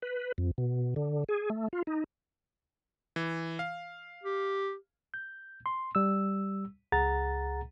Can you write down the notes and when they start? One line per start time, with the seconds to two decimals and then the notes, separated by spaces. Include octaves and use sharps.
0.02 B4
0.38 F2
0.58 B2
0.96 D3
1.29 G#4
1.50 A3
1.73 F4
1.87 D#4
3.16 E3
3.59 F5
4.23 G4
5.14 G6
5.66 C6
5.95 G3 E6
6.92 C#2 G#4 F#5 A#5 A6